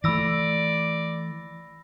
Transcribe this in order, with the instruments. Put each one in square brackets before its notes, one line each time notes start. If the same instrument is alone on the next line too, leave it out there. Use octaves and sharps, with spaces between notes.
[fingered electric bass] E3 A3 [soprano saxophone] D5 [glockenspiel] B5 E6 A#6